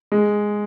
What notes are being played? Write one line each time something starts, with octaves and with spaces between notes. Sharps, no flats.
G#3